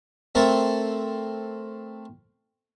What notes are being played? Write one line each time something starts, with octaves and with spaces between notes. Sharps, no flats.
A3 C4 A4 A#4